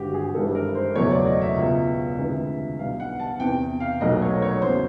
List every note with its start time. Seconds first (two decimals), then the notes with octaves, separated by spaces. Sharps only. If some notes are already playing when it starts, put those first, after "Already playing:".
Already playing: G#1 G2 D3 F#4 G4
0.14 G#4
0.34 G#1 G2 E3 G3 A4
0.55 A#4
0.75 C5
0.95 F#1 E2 B2 F#3 A3 C#5
1.11 D5
1.26 D#5
1.41 E5
1.57 C#2 B2 G#3
2.18 D2 C3 E3 G#3
2.79 B1 B2 G3 F5
3.00 F#5
3.19 A5
3.40 E2 C3 E3 G5
3.80 F5
4.01 B1 A#2 F#3 A3 D#5
4.22 C#5
4.42 C#5
4.62 E2 C#3 F#3 C5